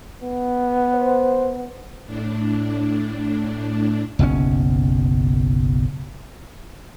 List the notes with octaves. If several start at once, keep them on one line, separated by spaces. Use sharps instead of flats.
B3
C5
A2 D4
F#1 B1 C#3 C#4